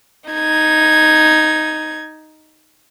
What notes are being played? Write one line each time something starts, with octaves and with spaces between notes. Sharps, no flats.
D#4 G#6